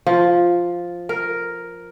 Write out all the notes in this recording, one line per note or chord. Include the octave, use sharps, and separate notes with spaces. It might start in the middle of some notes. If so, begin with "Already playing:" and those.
F3
A#4